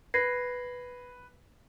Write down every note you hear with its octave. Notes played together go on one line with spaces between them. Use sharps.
B4 G#6 A#6 C7